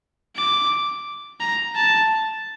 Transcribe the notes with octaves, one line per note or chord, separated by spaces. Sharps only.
D6
A#5
A5